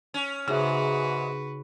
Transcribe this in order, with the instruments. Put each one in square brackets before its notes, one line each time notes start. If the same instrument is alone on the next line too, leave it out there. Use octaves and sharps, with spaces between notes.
[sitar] C#4
[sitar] G#2 [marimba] C#3 [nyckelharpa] F#4 B4 [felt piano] G#4 E5